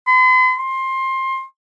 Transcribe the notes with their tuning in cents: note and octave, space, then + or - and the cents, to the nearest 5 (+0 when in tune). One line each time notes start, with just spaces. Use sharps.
C6 -45
C6 +20